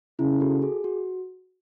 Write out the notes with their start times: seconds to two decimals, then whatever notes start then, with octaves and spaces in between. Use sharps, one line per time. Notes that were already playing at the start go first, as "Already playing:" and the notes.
0.19 C#3 E4
0.40 F#4 A4
0.62 G#4
0.84 F#4